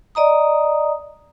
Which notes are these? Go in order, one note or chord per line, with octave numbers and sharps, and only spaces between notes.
D5 D#5 A#5 D#6